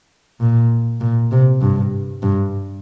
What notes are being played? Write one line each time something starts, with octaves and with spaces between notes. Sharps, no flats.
A#2
A#2
C3
G2
G2